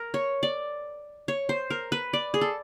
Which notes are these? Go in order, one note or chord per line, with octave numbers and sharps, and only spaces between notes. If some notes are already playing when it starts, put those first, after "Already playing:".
Already playing: A#4
C#5
D5
C#5
C5
A#4
B4
D5
G#4
A4